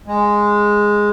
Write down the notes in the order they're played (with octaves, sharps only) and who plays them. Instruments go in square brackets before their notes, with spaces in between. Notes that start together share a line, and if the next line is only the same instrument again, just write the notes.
[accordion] G#3